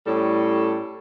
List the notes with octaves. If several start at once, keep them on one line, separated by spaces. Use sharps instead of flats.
A2 G3 C#4 A4